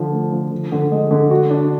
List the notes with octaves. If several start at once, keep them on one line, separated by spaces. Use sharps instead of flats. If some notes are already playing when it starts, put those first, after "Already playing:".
Already playing: D3 F3
A3
F3
D3
D3
G#3
D3
F#4
D4